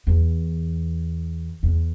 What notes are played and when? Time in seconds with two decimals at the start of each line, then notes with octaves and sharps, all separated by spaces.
0.07 E2
1.63 E2